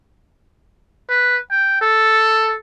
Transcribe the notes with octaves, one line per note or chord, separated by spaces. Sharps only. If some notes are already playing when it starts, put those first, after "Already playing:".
B4
G5
A4